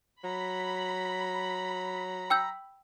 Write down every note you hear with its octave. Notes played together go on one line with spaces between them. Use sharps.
F#3 A#5 B5
G5 E6 G6